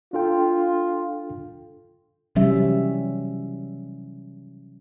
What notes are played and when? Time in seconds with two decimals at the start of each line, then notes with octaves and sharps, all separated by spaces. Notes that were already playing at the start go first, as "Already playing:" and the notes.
0.13 D4 F4 A4 G5
2.35 C3 E3 F#3 G3 C#4 E5